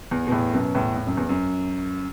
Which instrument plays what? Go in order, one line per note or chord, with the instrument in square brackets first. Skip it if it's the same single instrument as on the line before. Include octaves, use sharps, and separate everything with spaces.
[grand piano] E2
B2
E2 A2
F#2 B2
E2 A2
A2
F#2
E2
F#2